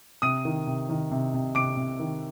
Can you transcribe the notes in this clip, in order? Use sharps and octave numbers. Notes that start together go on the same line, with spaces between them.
C3 D#6 D#7
D#3
C3
D#3
C3
C3
C3 D6 D7
C3
D#3